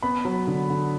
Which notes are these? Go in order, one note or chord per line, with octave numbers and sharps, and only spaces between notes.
B3 B5
F#3
D3
D3